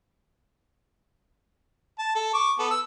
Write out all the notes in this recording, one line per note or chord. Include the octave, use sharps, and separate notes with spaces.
A5
A4
C#6 D6
B3 A4
E6